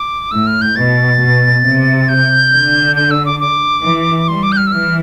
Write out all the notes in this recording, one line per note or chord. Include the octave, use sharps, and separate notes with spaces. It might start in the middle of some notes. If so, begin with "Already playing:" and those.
Already playing: D6
A2 E6
F6
G6
B2 A6
B2
C3
G6
D3
G6
E6
D6
D6
E3
G3 C6
D6
G6
F6
E6
E3 F6